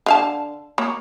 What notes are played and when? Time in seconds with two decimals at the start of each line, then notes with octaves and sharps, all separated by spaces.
0.06 D3 F5 A5
0.78 A#3 C#5